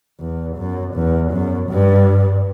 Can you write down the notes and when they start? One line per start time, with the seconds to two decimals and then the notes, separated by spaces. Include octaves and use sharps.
0.20 E2
0.57 F#2
0.95 E2
1.32 F#2
1.70 G2